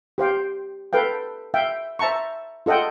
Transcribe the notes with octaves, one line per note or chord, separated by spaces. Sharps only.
G4 C5 F5 G5
A4 B4 F5 G5
E5 F5 G5
C5 E5 A5 A#5 C#6
F4 A4 D#5 F#5 G5